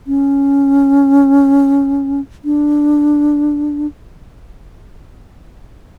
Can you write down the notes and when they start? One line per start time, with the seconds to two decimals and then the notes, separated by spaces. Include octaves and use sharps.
0.07 C#4
2.45 D4